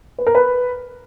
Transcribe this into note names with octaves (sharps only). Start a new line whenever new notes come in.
B4
A#4
B4